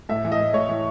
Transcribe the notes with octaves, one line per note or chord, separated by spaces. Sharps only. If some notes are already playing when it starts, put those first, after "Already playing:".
A2 E5
E3
D#5
A2
A2 C#5
E3